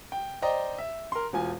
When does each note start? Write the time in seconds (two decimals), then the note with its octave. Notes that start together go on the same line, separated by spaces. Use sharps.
0.12 G5
0.42 C5 D5 D#5 G5 A#5
0.78 E5
1.12 A#4 C6
1.33 E1 F4 G#5